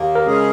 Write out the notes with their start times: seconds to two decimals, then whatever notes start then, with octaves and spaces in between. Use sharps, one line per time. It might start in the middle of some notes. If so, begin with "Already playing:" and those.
Already playing: D#2 A#3
0.15 A#4
0.26 C#3 G#3 C#4 G#4